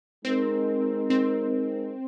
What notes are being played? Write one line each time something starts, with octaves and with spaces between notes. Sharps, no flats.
G#3 C4 D#4 A#4
C4